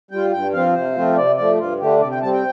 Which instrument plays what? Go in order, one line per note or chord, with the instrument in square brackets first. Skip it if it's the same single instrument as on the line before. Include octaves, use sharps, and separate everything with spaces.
[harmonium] G3 F4 G5
G2 G5
F3 C4 F4 F5
C3 C5
F3 A3 C4 F4
C3 D5
F3 A3 D5
G2 F4
D3 A3 D4 G4
C3 D5
G5
G3 C4 A5
G5